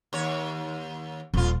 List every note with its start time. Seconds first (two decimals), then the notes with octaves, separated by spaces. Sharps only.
0.13 D#2 C#5
1.34 D#1 F2 F4